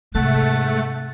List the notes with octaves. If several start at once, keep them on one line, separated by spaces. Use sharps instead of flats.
G#2 C3 A3 F#5 A6